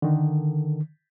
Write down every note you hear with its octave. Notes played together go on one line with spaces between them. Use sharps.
D3 D#3